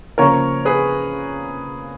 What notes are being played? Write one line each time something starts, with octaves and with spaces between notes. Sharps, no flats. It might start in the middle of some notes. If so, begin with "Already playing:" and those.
C#3 F3 A#3 A#4 C#5
G#4 B4